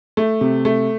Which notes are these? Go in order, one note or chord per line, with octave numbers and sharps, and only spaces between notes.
A3
C3
A3